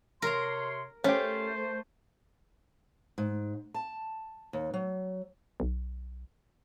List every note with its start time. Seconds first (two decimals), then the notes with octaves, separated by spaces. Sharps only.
0.22 C3 A#4 C#5 A#5 C6
1.04 A3 C#4 G4 C5
3.18 G#2
3.74 A5
4.53 D#2
4.74 F#3
5.60 B1